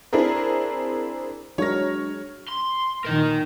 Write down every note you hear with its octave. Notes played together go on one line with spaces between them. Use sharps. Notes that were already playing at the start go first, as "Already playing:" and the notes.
C4 D4 E4 G#4 A#4
F#3 G#3 D4 A#4 C#5 A#6
C6
A#2 D#3 A#4 D#5